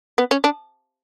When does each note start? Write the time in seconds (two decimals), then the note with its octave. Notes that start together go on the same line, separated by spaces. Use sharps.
0.18 B3
0.31 C#4
0.44 D4